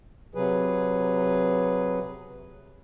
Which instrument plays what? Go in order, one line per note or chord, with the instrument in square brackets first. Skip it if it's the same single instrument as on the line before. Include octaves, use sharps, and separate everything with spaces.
[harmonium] C3 F#3 G#4 B4